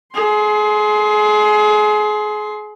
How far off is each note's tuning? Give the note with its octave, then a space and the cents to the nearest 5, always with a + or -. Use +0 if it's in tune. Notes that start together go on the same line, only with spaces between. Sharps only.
G#4 +30 C6 +0